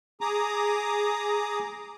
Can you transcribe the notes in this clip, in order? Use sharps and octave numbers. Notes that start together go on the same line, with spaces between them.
G#4 A#5 D6 D#6